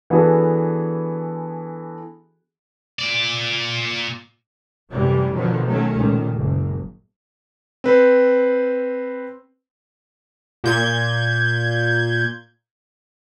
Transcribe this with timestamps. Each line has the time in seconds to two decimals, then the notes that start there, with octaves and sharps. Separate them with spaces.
0.10 E3 B3 D4 F#4 G#4 A4
2.99 A#2 D5
4.91 F#2 A2 C3 E3 G3
5.33 B2 D3 D#3 F3 F#3
5.67 D#3 F#3 A3 C#4
5.95 C#2 A#2 D#3
6.36 F#1
7.84 C4 B4 C5
10.64 A#2 G6 G#6